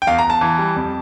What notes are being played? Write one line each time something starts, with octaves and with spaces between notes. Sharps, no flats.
G5
E2 F5
A#5
E2
A5
E3
G3
F2